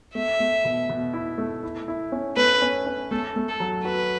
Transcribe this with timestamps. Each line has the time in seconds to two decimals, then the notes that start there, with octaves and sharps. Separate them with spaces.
0.15 A3 E5
0.40 A3
0.65 B2
0.89 B2
1.14 E4
1.38 A3
1.63 E4
1.88 E4
2.12 C#4
2.37 A3 B4
2.62 C#4
2.86 C#4
3.11 A3 A4
3.36 A3
3.49 A4
3.60 F#3
3.85 F#4 B4